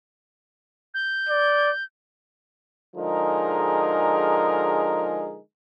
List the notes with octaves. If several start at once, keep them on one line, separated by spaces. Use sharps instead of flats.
G6
D5
D3 F3 G#3 D#4 G#4 A#4